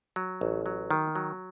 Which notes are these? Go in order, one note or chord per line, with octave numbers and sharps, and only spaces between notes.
F#3
A1
F#3
D#3
F#3